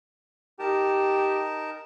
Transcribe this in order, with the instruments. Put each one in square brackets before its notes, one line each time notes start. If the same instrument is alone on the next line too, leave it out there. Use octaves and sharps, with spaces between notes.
[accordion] D#4 A#4 A5 [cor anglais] G4